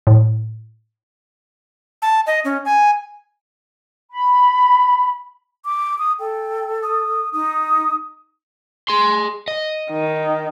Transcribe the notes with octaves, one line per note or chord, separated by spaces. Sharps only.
A2
A5
D#5
C#4
G#5
B5
D6
D#6
A4 G5
D#6
D#4 D#6
G#4 C6
D#5
D#3